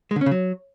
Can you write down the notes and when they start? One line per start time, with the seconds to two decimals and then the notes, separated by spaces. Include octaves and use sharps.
0.11 G#3
0.16 D3
0.21 C#4
0.26 C#3
0.31 F#3